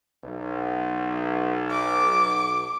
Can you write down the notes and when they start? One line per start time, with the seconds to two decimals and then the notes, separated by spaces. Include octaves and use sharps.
0.24 B1
1.71 D6